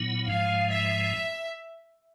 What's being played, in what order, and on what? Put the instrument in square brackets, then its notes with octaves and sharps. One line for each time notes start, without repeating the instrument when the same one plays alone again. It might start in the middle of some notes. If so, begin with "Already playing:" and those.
Already playing: [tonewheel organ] A#2 F#3 B3 E4
[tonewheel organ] G#2 F3 G#3 [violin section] F5
[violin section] E5